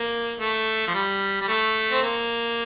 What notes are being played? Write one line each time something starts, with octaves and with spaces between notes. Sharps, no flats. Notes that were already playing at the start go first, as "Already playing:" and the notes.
Already playing: A#3
A3
F3
G3
G3
A3
C4
A#3